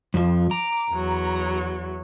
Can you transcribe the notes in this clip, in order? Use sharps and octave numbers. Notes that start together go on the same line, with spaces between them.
F2 F3
A#5 D6
E2 F#3